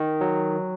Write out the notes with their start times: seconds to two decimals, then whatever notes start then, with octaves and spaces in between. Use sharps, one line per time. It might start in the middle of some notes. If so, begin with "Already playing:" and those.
Already playing: D#3
0.21 F#3